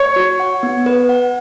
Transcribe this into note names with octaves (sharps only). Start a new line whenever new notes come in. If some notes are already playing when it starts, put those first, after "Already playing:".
Already playing: C#5
F#4
F#5
B3
B4
F#5